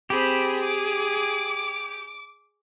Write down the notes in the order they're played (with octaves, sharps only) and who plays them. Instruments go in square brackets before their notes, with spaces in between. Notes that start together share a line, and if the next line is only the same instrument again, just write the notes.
[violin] C4 B5 [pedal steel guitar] G4 [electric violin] G#4
[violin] D6